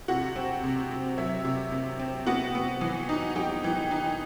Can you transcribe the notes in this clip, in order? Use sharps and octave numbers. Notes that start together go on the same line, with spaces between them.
C3 F#4 F#5
C4
C3
C3
F#3 E5
C3
C3
C4
B3 F#4 F#5
B3
E3
D#4
E3 G4 G5
E3
D#4